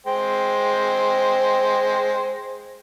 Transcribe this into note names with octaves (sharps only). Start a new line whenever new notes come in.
G#3 C5 G5